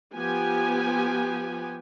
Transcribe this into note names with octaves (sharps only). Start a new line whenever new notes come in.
F3 B3 G4 G#5